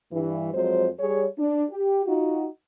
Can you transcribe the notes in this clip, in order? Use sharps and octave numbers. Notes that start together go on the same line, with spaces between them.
G2 E3
F2 F#3 G#3 C5
G3 G#4 C#5
D4
G4
D#4 F4 F#4